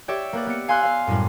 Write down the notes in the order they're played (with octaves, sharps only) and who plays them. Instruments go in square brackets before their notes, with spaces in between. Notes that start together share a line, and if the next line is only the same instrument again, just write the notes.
[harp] G4 C#5 D5 E5
A#3 B4 D5
B3 D5 C#7
F5 G#5 C6 E6 F#6
C5 F5
F#2 A2 G3